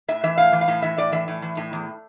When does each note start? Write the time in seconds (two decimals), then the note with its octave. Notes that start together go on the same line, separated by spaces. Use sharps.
0.08 A2 E5
0.23 E3 E5
0.38 A2 F5
0.52 E3
0.61 F5
0.68 A2
0.82 E3 E5
0.98 A2 D5
1.12 E3 E5
1.28 A2
1.42 E3
1.57 A2
1.73 E2